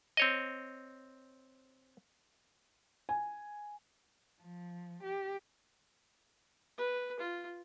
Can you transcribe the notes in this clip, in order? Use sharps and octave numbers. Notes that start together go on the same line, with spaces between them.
C4 C#5 D#5
G#5
F3
G4
B4
F4